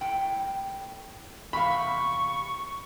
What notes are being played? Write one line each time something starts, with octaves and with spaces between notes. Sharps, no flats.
A2 G5
E2 C3 F5 B5 C#6